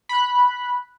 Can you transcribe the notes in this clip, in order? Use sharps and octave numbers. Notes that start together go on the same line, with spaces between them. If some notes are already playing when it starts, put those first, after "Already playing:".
B5 F#6